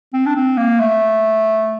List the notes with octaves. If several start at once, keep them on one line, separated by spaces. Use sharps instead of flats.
C4
D4
C4
A#3
A3